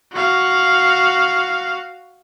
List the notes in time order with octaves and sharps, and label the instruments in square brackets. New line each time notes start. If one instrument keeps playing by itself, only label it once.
[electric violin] F#4 F5